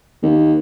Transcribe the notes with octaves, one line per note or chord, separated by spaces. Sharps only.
D#2